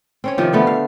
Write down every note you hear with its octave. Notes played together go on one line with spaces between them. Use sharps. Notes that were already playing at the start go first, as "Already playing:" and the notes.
C4 C#4 C#5
C3 D#3 F3 G4
D3 A3 B3
F5